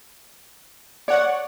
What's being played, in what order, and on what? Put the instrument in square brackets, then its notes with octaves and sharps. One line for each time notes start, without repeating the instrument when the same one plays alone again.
[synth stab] C#5 F#5 [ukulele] D5